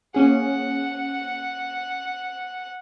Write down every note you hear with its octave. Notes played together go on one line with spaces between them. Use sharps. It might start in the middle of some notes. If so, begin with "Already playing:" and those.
A#3 C#4 G#4 F#5